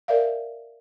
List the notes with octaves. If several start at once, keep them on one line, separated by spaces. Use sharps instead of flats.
A#4 D5 E5 F5